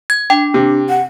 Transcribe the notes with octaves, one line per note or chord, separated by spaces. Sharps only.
G#6
D4 G5
C3
F#5